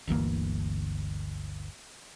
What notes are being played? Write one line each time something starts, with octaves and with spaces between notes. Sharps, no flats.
G1 D2 E3 A#3